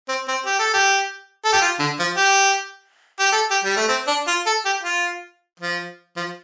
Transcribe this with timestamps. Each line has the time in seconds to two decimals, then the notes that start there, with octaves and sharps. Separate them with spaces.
0.09 C4
0.28 C4
0.46 G4
0.59 A4
0.74 G4
1.45 A4
1.53 G4
1.61 F4
1.79 D3
1.99 F3
2.17 G4
3.20 G4
3.32 A4
3.51 G4
3.65 G3
3.77 A3
3.89 C4
4.08 D4
4.28 F4
4.46 A4
4.65 G4
4.84 F4
5.60 F3
6.17 F3